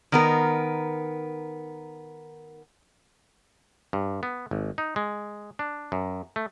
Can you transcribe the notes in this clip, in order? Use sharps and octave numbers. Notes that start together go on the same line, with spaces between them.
D#3 B3 A#4
G2
B3
G#1
D#4
G#3
D4
F#2
A3